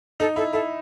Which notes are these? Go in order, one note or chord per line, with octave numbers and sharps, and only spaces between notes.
D#4 A4
E4 A4
E4 A4